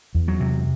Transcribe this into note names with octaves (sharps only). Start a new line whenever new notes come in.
E2
F#3
C3